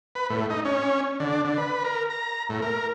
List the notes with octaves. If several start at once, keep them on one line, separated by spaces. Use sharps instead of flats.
B4
A2
D#4
C#4
D3
D4
D3
B4
A#4
A#5
A2
A#4